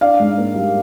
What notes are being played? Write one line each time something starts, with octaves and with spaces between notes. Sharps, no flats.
D4 D5 F5
G#2
A#3
G3